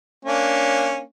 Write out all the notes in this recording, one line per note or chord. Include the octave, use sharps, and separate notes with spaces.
A#3 C#4 D4